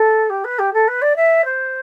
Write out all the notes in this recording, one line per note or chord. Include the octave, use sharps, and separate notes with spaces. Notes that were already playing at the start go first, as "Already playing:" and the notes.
Already playing: A4
G4
B4
G4
A4
B4
D5
E5
C5